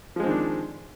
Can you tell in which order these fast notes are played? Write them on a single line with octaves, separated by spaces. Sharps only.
F3 G#3 C4 D#3 D4